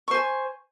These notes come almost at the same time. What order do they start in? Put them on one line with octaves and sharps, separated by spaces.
C#6 C5 G#5